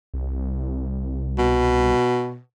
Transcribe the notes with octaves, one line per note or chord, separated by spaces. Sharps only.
C2
B2